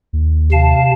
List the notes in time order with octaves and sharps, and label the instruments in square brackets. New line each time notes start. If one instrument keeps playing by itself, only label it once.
[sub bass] D#2
[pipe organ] C3 F5 A5